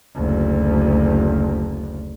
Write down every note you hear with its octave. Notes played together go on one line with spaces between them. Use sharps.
F#1 D2